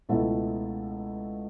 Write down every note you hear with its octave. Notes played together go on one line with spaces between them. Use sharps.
C#2 B2 A3 E4